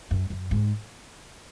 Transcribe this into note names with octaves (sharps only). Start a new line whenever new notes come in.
F#2
F#2
G#2